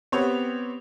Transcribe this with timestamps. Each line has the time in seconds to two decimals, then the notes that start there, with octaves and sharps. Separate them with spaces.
0.12 B3 C4 G4 C#5